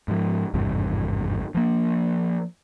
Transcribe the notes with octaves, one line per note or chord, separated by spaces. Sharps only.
G#2 F3
G#1 E2 G2 C3
F3 A#3